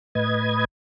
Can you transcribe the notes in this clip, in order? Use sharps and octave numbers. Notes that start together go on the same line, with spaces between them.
A2 B4 D#5 G#6